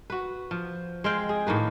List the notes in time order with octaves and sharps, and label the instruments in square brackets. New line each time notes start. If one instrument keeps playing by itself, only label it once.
[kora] F#4 B4
F3
G#3 C4 F5 G5
G#4
A2 D#3 A#3 B4